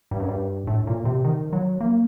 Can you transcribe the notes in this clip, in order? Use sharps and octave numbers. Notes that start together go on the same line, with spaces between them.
G2
F#2
G2
A2
A#2
C3
D#3
F#3
A#3